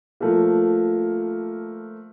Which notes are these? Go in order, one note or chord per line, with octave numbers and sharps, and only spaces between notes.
F3 A3 A#3